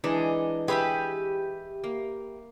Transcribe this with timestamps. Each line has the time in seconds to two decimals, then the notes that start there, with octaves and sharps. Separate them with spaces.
0.04 E3 G#3 D4 D#4
0.68 G4 G#4 B4 E5 B5
1.84 A#3